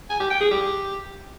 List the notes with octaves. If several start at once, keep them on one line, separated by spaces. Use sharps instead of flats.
G#5
G4
G5
G#4
G4